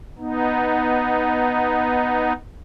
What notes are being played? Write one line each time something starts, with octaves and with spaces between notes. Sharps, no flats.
B3 D#4